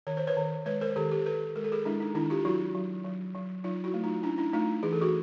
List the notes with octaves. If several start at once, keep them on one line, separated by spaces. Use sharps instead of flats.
D#3 C#5
C5
B4 C#5
D#3
G#3 B4 C#5
A#4 C5
D#3 G4 A4
G4 A4
D#3 A4 B4
G#3 A#4
A4
G#4 A#4
G#3 D4 E4
D#4
D#3 D4 E4
F4 G4
F#3 E4 F#4
F#3
F#3
F#3
F#3 D#4 F4
E4 F#4
A3
D#4 F4
C#4 D4 E4
D4 E4
A3 D#4 F4
E3 G#4
A4
F#4 G#4